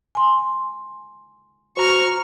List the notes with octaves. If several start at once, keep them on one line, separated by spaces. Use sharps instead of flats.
G#5 C6
F#4 C5 A#5 C#6 F6